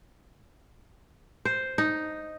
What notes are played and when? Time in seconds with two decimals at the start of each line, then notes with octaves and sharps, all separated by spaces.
1.45 C5
1.78 D#4